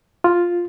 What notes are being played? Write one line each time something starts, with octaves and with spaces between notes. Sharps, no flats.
F4